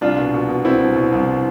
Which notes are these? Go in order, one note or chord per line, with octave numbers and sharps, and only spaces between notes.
C2 D4 F4
B2
B2
B2
B2 C4 E4
C2
B2
C2